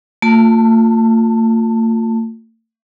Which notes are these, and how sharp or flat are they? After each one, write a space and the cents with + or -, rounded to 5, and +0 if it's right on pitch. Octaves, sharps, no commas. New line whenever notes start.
A3 +45 F4 +25 A5 +15